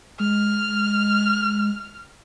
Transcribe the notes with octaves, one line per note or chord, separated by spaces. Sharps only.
G#3 F6